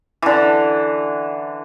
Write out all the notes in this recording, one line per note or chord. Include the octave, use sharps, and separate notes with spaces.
D3 E3